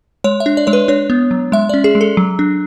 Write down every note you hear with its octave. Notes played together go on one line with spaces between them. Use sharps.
G#3 C#5
E5
D4
D5
G#3 C#5
B4
D4 C#5
B3
F#3
G#3 E5
C#4 D5
G#4
G#3
A4
F#3
D4